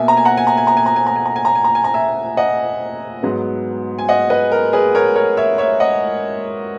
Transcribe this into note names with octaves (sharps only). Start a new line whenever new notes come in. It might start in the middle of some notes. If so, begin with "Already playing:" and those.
Already playing: B2 A#3 E5 G#5
A#5
G#5
F#5 A#5
G#5
A#5
G#5
A#5
G#5
A#5
G#5
A#5
G#5
A#5
G#5
A#5
G#5
A#5
G#5
A#5
E5 G#5
D#5 F#5
G#2 F#3 B3
G#5
D#5 F#5
B4 D#5
A#4
G#4 B4
A#4 C#5
A#4 C#5
C#5 E5
C#5 E5
D#5 F#5